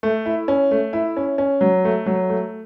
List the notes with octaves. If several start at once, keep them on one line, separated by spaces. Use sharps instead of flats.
A3
E4
C#4
A3
E4
C#4
C#4
F#3
A3
F#3
A3